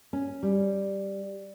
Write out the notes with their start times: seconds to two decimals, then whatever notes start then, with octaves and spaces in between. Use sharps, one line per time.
0.13 C#4
0.43 G3